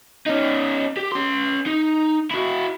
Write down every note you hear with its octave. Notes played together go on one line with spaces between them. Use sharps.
C#4 D#4
G4
C#4 C6
D#4
E4 F#4